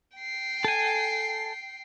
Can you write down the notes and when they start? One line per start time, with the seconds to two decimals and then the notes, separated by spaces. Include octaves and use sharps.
0.17 G5 C7
0.64 A4 G#5